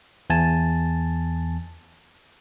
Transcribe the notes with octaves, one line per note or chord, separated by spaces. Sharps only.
E2 G#5 A5